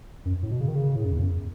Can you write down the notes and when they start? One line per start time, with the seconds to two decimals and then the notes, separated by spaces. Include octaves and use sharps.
0.25 F#2
0.43 A2
0.51 B2
0.60 C#3
0.68 D#3
0.75 C#3
0.96 A2
1.04 F#2
1.13 E2
1.22 F#2